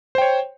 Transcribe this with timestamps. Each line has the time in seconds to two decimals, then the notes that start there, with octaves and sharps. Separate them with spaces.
0.15 C5
0.18 G5
0.22 C#5